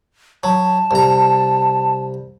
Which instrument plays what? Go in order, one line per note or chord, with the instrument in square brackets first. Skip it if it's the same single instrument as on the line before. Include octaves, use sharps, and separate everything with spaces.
[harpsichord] F#3 [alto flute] A5
[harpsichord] C2 A#5